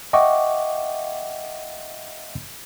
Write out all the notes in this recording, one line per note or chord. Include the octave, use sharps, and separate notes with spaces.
D#5 E5 F#5 G5 C#6 D6